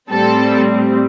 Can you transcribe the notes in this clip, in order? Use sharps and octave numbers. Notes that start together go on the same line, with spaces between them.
A2 G3 C4 A4